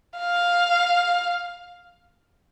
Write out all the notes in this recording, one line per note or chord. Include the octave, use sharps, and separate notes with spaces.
F5